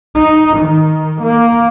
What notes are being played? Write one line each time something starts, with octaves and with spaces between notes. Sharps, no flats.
D#4
D#3
A#3